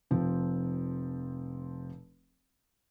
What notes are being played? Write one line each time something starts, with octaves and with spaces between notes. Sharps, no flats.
F1 F3 C4